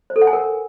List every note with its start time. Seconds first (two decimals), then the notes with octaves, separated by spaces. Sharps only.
0.10 C5
0.16 A4
0.22 F#5
0.27 G#5
0.33 A#4